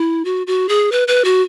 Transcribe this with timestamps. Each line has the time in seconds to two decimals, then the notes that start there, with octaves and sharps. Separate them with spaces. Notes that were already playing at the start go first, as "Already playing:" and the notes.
Already playing: E4
0.25 F#4
0.47 F#4
0.69 G#4
0.92 B4
1.08 B4
1.25 F#4